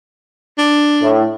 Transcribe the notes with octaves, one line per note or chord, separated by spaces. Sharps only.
D4
A2